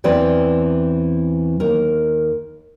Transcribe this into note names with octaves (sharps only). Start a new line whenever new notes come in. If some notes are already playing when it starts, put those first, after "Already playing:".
E2 E3 C4 B4 D5 G5
D#2 A#4